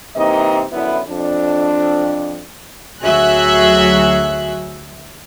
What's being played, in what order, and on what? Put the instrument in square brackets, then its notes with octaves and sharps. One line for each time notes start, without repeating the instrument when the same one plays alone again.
[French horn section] C3 E3 A#3 D#4 D#5
F#2 D3 B3 E4
F2 D4
[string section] D2 F#3 F#4 G#4 E5 F#6